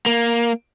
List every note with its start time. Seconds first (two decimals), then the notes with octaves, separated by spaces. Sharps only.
0.06 A#3